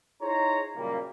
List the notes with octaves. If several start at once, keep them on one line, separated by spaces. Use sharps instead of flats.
D#4 E4 G#4 C5 C#5 A#5
F#2 A#2 C#3 G3 A#3